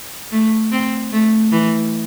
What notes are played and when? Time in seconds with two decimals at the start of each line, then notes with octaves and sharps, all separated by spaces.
0.32 A3
0.71 C4
1.12 A3
1.52 E3